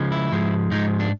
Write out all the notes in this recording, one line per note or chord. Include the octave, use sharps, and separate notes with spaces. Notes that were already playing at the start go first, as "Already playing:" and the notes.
Already playing: C#2 C#3 F3 G#3
E4
G#2 F3 G#3
G#2 F3 G#3 D#4
D4